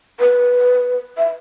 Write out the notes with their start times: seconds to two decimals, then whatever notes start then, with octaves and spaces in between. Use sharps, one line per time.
0.20 B4
1.18 E5